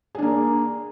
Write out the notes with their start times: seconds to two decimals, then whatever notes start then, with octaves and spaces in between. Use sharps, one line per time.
0.15 G#4
0.18 D4
0.22 A#3